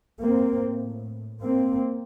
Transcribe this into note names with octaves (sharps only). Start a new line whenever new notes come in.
A2 A#3 C4
A#3 C4